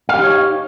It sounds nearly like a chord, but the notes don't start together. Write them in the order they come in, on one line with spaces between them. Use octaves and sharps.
F5 G4 D#4 C#5